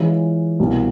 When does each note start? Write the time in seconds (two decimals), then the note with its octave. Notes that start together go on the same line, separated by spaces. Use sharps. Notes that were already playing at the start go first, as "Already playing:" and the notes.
Already playing: E3 G#3 C#4 F4
0.59 C2 B2 G3 A#3